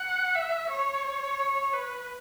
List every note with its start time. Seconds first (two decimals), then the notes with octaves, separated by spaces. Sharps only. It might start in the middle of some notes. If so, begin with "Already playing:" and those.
Already playing: F#5
0.35 E5
0.69 C#5
1.73 B4